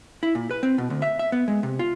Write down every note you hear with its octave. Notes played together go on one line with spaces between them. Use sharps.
E4
A#2
B4
C4
B2
D2
E5
E5
B3
G#3
C3
F4